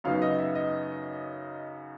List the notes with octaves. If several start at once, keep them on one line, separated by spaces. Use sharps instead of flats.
F#2 C#3 F#3 B3 D#4 F5
D#5
E5
D#5